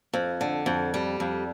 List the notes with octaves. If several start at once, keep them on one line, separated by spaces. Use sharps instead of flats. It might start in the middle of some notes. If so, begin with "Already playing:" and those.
F2
D3
F2
G3
F2